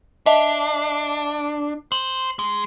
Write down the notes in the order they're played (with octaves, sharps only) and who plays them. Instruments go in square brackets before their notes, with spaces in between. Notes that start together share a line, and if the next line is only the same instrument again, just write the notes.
[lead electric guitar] D4 [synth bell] D#5 E5 A5
[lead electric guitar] C5 [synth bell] F#7
[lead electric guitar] G#3